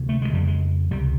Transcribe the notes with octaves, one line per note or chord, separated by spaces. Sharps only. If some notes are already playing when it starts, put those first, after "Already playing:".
Already playing: D2 C3
A3
G#3
F2 C#3 G3
G#3
C#2 C3 G3